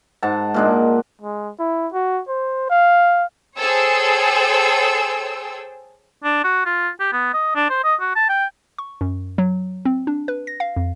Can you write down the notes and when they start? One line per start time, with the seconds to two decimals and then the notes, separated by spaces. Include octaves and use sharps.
0.23 G#2 F#5 A5
0.54 A#2 G#3 D4
1.21 G#3
1.59 E4
1.93 F#4
2.28 C5
2.70 F5
3.57 G#4 A4 C5 C#5 G5 E6
6.24 D4
6.44 F#4
6.65 F4
7.00 G4
7.12 B3
7.33 D#5
7.55 D4
7.70 C5
7.84 D#5
8.00 F#4
8.15 A5
8.29 G5
8.78 C#6
9.01 F#2
9.38 F#3
9.85 C4
10.07 D4
10.28 B4
10.47 A#6
10.60 F5
10.76 F2